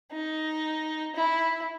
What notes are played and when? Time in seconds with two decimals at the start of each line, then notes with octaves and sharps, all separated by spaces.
0.12 D#4
1.15 E4